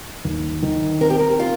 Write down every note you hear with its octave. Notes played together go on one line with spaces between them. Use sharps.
D#2
D#3
C4 A#4
G4
A#4
F4